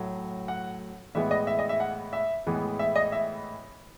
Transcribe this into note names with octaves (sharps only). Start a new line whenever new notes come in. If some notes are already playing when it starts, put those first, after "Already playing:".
Already playing: A2 F#3 A3
F#5
A2 E3 G#3 B3 E5
D#5
E5
D#5
E5
F#5
E5
A2 E3 G#3 B3
E5
D#5
E5